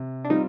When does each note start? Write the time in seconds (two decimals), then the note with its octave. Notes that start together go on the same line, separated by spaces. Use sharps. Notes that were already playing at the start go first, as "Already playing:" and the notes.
Already playing: C3
0.25 D4
0.30 G3 C4 D#4 F4